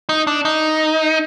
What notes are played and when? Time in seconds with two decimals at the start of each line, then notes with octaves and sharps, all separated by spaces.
0.09 D#4
0.27 D4
0.45 D#4